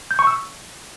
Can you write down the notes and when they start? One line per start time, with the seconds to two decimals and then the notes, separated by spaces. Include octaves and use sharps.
0.11 G6
0.19 C#6
0.27 E6